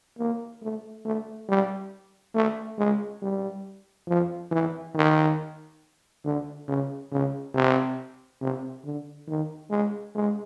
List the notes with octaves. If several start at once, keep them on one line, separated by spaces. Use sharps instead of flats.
A#3
A3
A3
G3
A3
G#3
G3
F3
E3
D#3
D3
C#3
C#3
C3
C3
D3
D#3
G#3
G#3